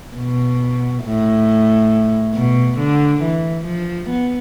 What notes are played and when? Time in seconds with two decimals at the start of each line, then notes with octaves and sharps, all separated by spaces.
0.16 B2
1.04 A2
2.35 B2
2.79 D3
3.23 E3
3.65 F3
4.10 B3